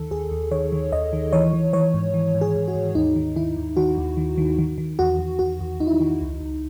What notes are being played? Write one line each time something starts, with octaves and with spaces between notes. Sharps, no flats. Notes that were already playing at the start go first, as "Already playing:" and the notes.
Already playing: D#2 D#3 A4
D#2 G#4
D#2
D#3 C#5
D#3
D#2 D#5
D#3
E3 C#5
E3
E3 C#5
G#2
E3
G#2
G#4
G#2
F#4
G#2
D#2 D#4
D#3
D#3 E4
D#2
D#3 F#4
D#2
D#3
D#3
D#3
D#3
E2 F#4
E2
E2 F#4
E2
E2 D#4
E4
D#4
D#3
C#2
C#2